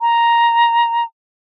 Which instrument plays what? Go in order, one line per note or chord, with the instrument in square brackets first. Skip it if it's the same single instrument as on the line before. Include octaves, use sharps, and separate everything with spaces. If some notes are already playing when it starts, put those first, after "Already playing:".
[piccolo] A#5